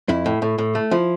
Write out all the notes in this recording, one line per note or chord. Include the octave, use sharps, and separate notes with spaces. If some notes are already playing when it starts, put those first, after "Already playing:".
F2 E4
A2
A2
A2
A3
F3 E4